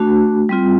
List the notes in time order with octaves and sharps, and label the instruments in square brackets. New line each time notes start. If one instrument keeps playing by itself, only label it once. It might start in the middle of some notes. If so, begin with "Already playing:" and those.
Already playing: [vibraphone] A3 D4 F#4
G3 C4 F4